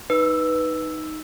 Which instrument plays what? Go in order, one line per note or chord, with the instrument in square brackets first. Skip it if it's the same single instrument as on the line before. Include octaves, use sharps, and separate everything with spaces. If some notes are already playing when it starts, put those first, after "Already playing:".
[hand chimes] D#4 E6 [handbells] B4